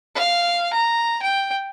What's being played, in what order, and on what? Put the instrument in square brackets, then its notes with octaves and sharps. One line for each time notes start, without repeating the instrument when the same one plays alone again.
[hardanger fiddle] F5
A#5
G5